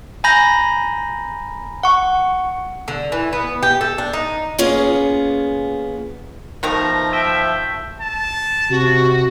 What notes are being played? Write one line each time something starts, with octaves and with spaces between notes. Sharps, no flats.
G#5 A#5 B5 G6 A#6
F#5 C#6
D3
E3
B3
G4
A4
D4
D#4
A#3 B3 C#4 F4 G#4
B2 D#3 F3 A3 A#5
E5 G5
A5
C3 F#4